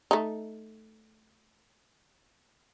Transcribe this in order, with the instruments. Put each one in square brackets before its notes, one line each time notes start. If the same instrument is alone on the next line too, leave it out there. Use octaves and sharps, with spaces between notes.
[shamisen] A3 D#4